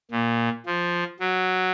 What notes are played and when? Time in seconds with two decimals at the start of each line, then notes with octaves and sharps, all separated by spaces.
0.11 A#2
0.66 F3
1.20 F#3